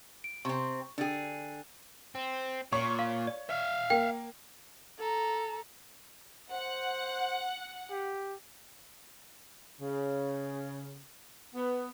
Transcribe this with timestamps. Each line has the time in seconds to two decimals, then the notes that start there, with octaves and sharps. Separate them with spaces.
0.24 D7
0.45 C3 C4 C#6
0.98 D3 D4 G#4 G5
2.15 C4
2.72 A#2 C#5 C#6
2.99 F5
3.27 D5
3.50 E5 F5
3.90 A#3 G5
4.99 A4 A#5
6.52 C5 F#5
7.91 G4
9.81 C#3
11.56 B3